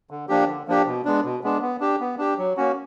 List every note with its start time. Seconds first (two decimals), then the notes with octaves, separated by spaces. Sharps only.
0.10 D3
0.29 F3 A#3 D4 G4
0.48 D3
0.68 F3 A#3 D4 G4
0.86 B2
1.05 G#3 B3 D4
1.24 B2
1.43 G#3 B3 D4
1.61 B3
1.80 D4 G4
2.00 B3
2.18 D4 G4
2.38 F#3
2.57 A#3 C#4 F#4